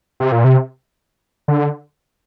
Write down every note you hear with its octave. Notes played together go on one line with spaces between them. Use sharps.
C3
A#2
C3
D3